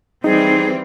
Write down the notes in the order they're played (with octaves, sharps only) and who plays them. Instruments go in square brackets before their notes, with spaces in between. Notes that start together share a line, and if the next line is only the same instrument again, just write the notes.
[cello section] E3 G3 C4 [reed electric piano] D#4 [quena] G#4